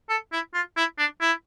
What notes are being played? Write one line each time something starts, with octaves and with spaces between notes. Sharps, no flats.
A4
E4
F4
E4
D4
E4